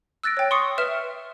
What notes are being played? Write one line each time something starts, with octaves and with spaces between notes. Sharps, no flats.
E6 F#6 A6 A#6 D7
C#5 G5
C6 C#6 D#6 C7 C#7
B4 E5 F6 E7